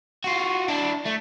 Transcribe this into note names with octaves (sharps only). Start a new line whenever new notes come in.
F4 F#4
D4 E4
A3